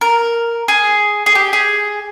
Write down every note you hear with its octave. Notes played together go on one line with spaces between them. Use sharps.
A#4
G#4
G#4
G4
G#4